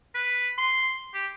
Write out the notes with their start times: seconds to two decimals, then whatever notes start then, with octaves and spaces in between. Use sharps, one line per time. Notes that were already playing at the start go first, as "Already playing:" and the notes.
0.15 B4
0.58 C6
1.14 G4